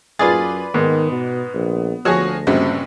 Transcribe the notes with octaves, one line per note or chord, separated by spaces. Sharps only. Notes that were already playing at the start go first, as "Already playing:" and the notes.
F#2 F4 G#4 B4 D5 A6
G#2 D#3 B3
B2
A#1
D2 F3 F#4 G#4 C#5 C#6 A#6
A#1 G2 C#3 C4 F#4